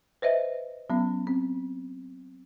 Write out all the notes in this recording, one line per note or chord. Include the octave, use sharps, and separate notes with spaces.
B4 C5 D#5 E5
F#3 B3 C#4
C4